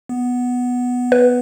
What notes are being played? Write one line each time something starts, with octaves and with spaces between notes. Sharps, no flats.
B3
B4